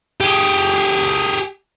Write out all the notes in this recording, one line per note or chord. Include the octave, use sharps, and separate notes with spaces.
G4 G#4